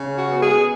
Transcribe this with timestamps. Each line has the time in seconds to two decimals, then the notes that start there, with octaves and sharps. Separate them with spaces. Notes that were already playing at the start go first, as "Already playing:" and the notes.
Already playing: C#3
0.18 F#4
0.30 B3
0.43 G#4